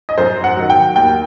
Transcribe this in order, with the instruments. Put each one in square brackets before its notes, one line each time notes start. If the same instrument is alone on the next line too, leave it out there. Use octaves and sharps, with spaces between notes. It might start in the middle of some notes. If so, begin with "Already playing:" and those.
[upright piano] D#5
F#2 C5
F#5
D#3 F#3
G5
D#2 G5